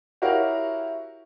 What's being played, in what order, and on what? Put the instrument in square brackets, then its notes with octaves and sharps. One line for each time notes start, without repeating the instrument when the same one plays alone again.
[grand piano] E4 F#4 G4 A#4 C#5 F5